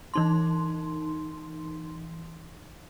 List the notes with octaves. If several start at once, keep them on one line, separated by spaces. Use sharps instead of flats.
E3 D#4 C6